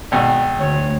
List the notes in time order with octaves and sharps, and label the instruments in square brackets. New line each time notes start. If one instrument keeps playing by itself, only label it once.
[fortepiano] G#1 B2 [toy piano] D5 G5
[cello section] D2 [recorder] C#5